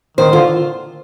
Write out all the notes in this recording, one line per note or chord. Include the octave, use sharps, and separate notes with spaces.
D#3 C5
D3 F4